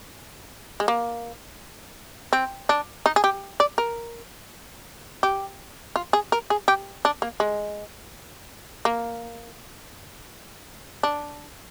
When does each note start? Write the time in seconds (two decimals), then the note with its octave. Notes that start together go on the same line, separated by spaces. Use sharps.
0.80 G#3
0.88 A#3
2.33 C4
2.69 D4
3.06 D#4
3.16 G#4
3.24 G4
3.60 D5
3.78 A#4
5.23 G4
5.96 F4
6.13 G#4
6.32 A#4
6.50 G#4
6.68 G4
7.05 D4
7.22 A#3
7.40 G#3
8.85 A#3
11.03 D4